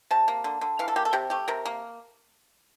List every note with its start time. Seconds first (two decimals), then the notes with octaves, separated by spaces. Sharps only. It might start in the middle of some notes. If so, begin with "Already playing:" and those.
0.11 C3 A5
0.28 A#3
0.44 D3
0.61 D3
0.79 E3 F5
0.88 A4
0.96 A#3 G4
1.05 A4
1.13 C3 G4
1.30 A3 G4
1.48 C3 A#4
1.66 A#3